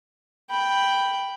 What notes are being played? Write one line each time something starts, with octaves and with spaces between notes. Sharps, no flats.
G5 B5